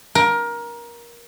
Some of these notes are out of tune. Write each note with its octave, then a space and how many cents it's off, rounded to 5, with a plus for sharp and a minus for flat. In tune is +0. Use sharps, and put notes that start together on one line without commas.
A#4 +20